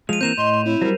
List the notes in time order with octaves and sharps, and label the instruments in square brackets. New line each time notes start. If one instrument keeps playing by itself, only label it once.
[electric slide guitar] F3 G#3 [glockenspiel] D#7 F7
[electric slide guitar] E3 A#3 C4 [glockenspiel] G6 E7 F7
[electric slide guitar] A2 [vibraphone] D#5 [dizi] C6
[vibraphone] C4 C#5 [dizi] E4
[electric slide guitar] F#3 G3 [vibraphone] A#4 C5